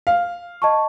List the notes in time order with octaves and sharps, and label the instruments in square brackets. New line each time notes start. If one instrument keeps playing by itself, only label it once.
[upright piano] F5
[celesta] D#5 A5 C#6